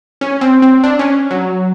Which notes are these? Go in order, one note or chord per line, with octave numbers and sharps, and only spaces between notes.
C#4
C4
C4
D4
C#4
F#3